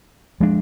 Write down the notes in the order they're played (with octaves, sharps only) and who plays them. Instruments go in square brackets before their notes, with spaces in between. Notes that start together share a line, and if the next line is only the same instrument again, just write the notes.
[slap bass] F3 G#3 D4